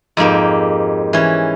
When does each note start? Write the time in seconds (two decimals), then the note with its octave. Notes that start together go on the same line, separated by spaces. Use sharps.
0.17 F2 G#2 A#3 G4
1.13 E3 C#4